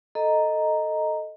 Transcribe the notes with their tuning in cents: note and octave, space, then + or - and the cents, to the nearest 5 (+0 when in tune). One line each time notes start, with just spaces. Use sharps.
A4 +0 D#5 +0 A#5 +0